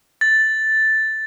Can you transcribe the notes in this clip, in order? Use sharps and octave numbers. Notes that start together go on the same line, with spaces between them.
A6